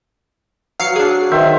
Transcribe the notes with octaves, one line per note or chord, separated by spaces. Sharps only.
F#3 F5 C7 C#7
D4 G#4
D#3 C5 E5